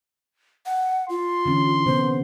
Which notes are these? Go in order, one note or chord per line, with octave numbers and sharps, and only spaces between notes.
F#5
F4 C6
D3 E3 C#4
C3 B3 C5